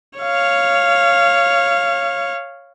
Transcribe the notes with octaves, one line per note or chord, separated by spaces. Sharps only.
C#5 F5